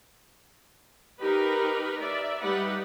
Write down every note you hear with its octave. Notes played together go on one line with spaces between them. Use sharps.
D#4 G4 A#4 B4
D5 E5
G3 D#4 G4 B4 F#5